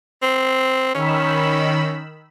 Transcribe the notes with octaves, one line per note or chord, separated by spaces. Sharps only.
C4
D#3 C#4 B5 E6